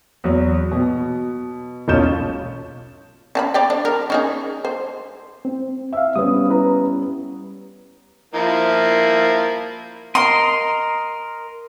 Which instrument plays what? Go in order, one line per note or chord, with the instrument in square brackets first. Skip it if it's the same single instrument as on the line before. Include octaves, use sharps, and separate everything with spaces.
[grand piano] E2 F#3
B2
E1 B1 C#4 F4 G6 E7
[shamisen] C#4 A5 B5
C#5 D5 G5
D4
A#4
C#4 D#4 G#4
C5
[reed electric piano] C4
[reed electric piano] E5 F5 [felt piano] E6
[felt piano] G3 B3 C#4 [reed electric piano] D#6
[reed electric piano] E4 B4 A#5
[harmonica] F3 A#3 E4
[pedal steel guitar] A#4 D#5 [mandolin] C6